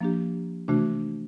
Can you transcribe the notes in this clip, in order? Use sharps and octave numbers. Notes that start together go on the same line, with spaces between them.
F3 A#3 D4 G4
C3 E3 A3 D4 F#4